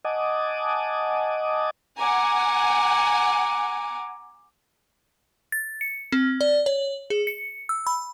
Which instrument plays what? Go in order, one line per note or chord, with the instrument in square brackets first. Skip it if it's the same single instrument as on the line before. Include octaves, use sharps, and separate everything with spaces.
[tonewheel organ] D#5 F#5 G#5 A5 D6 D#6
[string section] F#5 G#5 [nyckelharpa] A#5 D6
[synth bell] A6
C#7
C4
D5
C#5
G#4
C#7
E6
B5